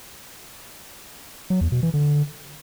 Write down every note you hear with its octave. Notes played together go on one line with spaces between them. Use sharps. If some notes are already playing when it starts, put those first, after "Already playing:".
F#3
E2
B2
E3
D3